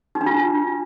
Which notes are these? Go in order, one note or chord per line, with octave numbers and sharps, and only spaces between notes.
D#4
D4
F4